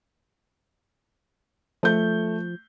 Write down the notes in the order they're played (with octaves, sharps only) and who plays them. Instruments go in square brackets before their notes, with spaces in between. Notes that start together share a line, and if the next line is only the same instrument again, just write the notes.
[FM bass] F3 [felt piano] A3 G6